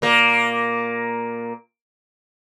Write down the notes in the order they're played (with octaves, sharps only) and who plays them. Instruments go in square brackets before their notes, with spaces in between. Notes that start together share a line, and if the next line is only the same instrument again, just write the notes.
[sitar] A#2 A#3